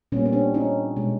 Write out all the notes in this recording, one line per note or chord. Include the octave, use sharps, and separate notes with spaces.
A#2 G3 A#3 B3 C#4
C#4
C4 D4
C#4 D#4
B2 G#3